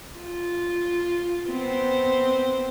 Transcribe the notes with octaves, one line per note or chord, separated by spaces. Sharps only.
F4
B3 C4 C5